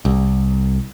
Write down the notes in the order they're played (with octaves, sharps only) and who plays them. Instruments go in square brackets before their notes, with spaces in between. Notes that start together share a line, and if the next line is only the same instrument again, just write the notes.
[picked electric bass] C2